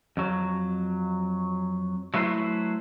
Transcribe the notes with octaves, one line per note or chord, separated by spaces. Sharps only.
F2 F#3
F#3 A3 E4 B4 C5